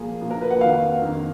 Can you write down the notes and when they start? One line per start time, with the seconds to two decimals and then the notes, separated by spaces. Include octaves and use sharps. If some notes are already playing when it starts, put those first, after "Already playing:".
Already playing: A#2 F3 A#3 G#4
0.21 A#2 F3 A#3
0.31 A#4
0.42 B4
0.51 F#5
0.61 F2 D#3 A#3 F5
1.02 F2 D#3 A#3